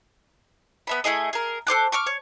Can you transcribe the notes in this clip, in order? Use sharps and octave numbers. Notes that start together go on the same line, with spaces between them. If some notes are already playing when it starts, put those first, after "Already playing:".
B3 E5 B5
A3 E4 G#4 D#5
G#4 A#4
A4 C5 D6 F#6
C#6 D6 F6
C#5